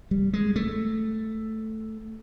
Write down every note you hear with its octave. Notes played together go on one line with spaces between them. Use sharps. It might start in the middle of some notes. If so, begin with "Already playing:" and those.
G3
G#3
A3